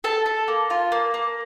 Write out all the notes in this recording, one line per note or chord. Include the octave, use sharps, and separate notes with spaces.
A4 A5
A4
A#3
F4
A#3
A#3